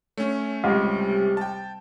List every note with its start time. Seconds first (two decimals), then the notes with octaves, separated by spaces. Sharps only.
0.17 A3 C#4 C#5
0.64 C#2 C3 G3 G4
1.37 G5 A5